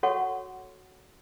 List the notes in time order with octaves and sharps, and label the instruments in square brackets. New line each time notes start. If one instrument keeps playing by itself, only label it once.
[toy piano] F#4 A4 C#5 F#5 C#6